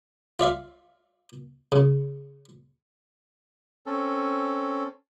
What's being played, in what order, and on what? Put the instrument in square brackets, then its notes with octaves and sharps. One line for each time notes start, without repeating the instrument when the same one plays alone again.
[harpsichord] F4 D5 E5 F5
C#3
[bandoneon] C4 C#4 A4